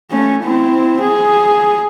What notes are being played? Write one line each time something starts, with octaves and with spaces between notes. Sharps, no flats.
A3 C#4
C4 E4
G#4